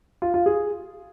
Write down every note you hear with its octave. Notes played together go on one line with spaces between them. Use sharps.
F4
F4
G#4